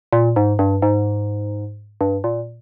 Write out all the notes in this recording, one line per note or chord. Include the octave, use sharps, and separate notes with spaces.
A#2
G#2
G2
G#2
G2
A#2